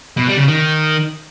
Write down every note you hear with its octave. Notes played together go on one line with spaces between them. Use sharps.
B2
G3
C#3
D#3